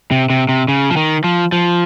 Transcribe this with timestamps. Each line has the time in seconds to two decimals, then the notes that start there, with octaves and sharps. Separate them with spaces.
0.11 C3
0.30 C3
0.49 C3
0.68 C#3
0.91 F3
0.97 D#3
1.24 F3
1.52 F3